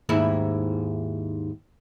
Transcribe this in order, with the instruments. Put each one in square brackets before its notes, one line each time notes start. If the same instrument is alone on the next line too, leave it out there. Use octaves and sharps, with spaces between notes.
[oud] D#2 G#2 E4